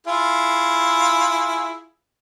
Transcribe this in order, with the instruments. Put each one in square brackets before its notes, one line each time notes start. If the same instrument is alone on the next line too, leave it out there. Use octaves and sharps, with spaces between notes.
[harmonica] E4 F4 G#4